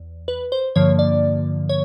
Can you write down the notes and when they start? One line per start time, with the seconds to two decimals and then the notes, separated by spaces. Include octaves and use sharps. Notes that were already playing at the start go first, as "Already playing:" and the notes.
Already playing: E2
0.28 B4
0.52 C5
0.76 G2 D3 F3 A#3 C#5
0.99 D5
1.69 C#5